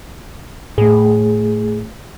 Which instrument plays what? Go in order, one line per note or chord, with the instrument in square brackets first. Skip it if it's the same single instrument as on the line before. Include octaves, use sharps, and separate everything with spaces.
[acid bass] A2 [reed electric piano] A3 G#4